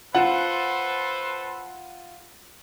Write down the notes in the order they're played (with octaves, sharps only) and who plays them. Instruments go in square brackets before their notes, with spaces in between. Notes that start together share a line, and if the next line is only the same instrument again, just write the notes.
[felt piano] F4 F#5 [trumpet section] A4 B4 C5